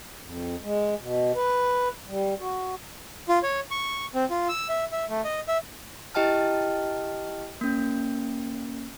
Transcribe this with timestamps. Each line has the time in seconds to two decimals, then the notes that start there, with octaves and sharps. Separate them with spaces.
0.21 F2
0.62 G#3
1.00 B2
1.35 B4
2.07 G3
2.40 F#4
3.29 F4
3.43 C#5
3.71 C#6
4.15 C4
4.30 F4
4.49 E6
4.69 E5
4.92 E5
5.09 A3
5.24 D#5
5.48 E5
6.15 E4 G4 D#5 G5 A5 F6
7.61 A#3 C#4